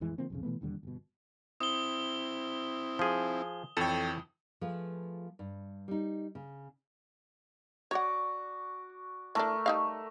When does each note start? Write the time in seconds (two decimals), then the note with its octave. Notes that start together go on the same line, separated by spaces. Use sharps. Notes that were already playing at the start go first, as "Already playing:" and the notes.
0.01 A1 F2 E3 G#3
0.18 D3 F3 A#3 C4
0.30 B1 F2 C#3
0.43 B2 E3 A3 B3
0.61 E1 D#2 D3 G3
0.83 G1 B2
1.60 C4 E4 D#6 G7
2.99 F3 G#4
3.77 F2 E3 A4 C#5 G5
4.61 F3 A3 F4 G#4 B4
5.39 G2
5.88 G3 D#4
6.35 C#3
7.91 F#4 C#5 D5 F#5
9.35 E3 A3 D4 A#4
9.66 G3 D#4 F5